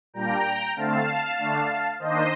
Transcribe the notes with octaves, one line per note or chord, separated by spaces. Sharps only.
A#2 G3 A#3 D4 G5 A#5
D3 A3 C4 F5 A5
D3 A3 D4
D#3 A#3 D4 C5 D#5